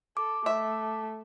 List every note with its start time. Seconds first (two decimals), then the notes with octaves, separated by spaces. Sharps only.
0.17 A4 D6
0.46 A3 E5